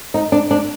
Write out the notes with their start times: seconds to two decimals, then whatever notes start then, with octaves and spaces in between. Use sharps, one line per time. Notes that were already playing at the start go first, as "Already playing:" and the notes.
0.14 D#4
0.32 D4
0.51 D4